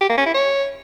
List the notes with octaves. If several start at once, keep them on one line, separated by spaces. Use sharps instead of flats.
G4
A#3
C#4
E4
C#5